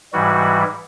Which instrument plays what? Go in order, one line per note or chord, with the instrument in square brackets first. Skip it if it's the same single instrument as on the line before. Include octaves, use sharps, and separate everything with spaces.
[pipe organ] G#2 E3 G3 F#4